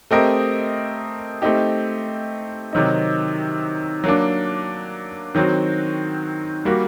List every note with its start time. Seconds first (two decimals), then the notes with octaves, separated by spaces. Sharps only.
0.11 A3 C4 G4 A#4 D#5
1.42 A3 C4 D#4 G4
2.73 C3 D#3 F#3 C4 D#4
4.04 F#3 A#3 D4
5.35 D#3 F#3 C4 F#4
6.65 G3 A#3 F#4